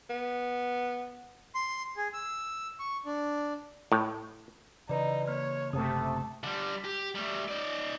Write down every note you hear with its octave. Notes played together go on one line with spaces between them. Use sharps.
B3
C6
G#4
E6
C#6
D4
A2
C#3 E3 D#4 B4 D5
A#3 C#5 F6
F#1 C3 A3 A4 D#6
D3 G3
G4
G3 A3
D#4 D5